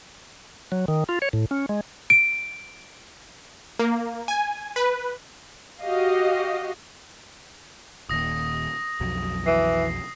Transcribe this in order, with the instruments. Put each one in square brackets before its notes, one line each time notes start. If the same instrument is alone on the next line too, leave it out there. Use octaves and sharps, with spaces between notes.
[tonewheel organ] F#3
D#3
F4
C#5
A2
C#4
G#3
[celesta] D7
[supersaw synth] A#3
G#5
B4
[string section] F#4 G4 D#5 F5
[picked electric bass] D#1 D#2 [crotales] D#6 A#6
[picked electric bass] B1 F2 F#3
[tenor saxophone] E3 [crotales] C7